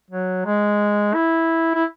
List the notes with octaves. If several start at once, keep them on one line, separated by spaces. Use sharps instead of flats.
F#3
G#3
E4
E4